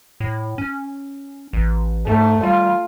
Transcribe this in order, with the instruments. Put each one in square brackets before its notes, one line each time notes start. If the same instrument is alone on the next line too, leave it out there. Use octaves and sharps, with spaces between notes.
[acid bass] A2
C#4
A1
[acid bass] G#2 [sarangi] A3
[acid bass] G3 [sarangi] F4